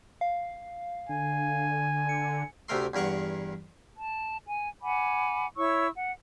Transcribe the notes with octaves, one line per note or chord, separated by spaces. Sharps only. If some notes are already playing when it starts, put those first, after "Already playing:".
F5
D3 G#5
C#7
D2 C3 A3 A#4 C6
E2 G2 A#4 F#5 C#6
A5
G#5
F#5 G#5 B5 D6
E4 C#5 C#6 E6
F#5